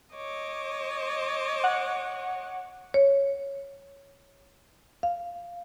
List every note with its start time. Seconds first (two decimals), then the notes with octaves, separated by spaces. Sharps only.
0.15 C#5 D#5 D6
1.64 F#5
2.94 C#5
5.03 F5